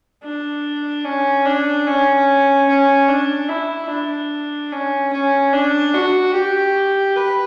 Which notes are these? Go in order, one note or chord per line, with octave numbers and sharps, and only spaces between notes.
D4
C#4
D4
C#4
C#4
D4
E4
D4
C#4
C#4
D4
F#4
G4
B4